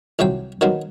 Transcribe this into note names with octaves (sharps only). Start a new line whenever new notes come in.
C2 C3 F#3 C4 G5
D#3 F#3 B3 C4